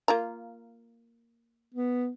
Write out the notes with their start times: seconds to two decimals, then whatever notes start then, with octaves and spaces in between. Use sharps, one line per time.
0.08 A#3 F4 A#5
1.74 B3